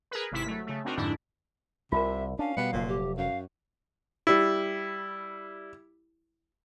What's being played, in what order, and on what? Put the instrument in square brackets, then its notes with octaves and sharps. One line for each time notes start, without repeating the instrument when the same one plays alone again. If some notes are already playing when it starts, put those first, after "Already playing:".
[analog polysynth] G#4 A#4 B4
G#1 C3 E4 B6
F#3 A3
C#3 A3
C4 D4 D#4 F#4 A#4
F2 G#2 D3 D4 E4
[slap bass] C2 [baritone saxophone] C3 [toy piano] F4 A#4 [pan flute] E5
[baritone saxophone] C#4 [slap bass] D4 [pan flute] F5
[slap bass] B2 G3 [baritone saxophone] B3
[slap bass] F1 F#3 [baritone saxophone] A#2
[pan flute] G4
[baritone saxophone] F#2 [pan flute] F5
[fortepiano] G3 E4